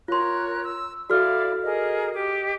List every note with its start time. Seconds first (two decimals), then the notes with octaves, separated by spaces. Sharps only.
0.08 F4 A#4 C#5 C6 F#6
0.64 E6
1.10 E4 F#4 A4 D5 F5 F6
1.63 G#4 A#4 D#5
2.14 G4 D#5 D6